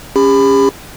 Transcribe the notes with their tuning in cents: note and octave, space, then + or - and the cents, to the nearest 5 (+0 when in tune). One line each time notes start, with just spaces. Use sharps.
C#4 +0 G4 +45 B5 +15